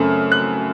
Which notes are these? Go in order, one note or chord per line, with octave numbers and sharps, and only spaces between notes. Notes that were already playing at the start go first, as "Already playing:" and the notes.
Already playing: F#2 C#3 A3 C4 F6
F#6